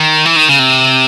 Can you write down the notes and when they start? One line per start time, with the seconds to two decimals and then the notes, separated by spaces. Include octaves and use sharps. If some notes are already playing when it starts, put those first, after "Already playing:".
Already playing: D#3
0.25 E3
0.36 D#3
0.49 C#3
0.59 C3